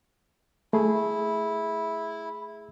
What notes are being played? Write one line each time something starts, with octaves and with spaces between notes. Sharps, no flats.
A3 E4 G#4